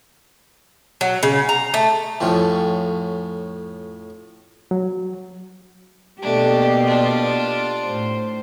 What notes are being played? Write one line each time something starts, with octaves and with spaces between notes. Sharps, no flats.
F#3
C#3
A#5
A3
F2 A2 F3 C#4
F#3
B2 A3 A#3 D4 G4
D4 F4
A2 C5